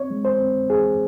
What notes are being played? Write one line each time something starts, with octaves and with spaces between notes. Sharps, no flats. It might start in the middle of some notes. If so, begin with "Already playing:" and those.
Already playing: C4 C#5
G#3
C5
C4
D#2 G#4